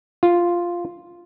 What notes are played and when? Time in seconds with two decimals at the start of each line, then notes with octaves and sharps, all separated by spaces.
0.23 F4